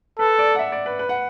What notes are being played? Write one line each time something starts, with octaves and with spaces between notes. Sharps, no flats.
A4 B4
D5
F#5
E5
D5
B4
B4
F#5